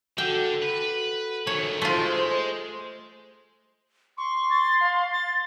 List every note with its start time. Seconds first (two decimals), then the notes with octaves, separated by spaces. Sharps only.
0.18 D3 F#4 A4 F#5 G5
0.62 B4
1.47 D#3 A3 C#5
1.82 G#3 A3 F4 C5
4.17 C6 C#6
4.50 A6
4.80 F5
5.12 A6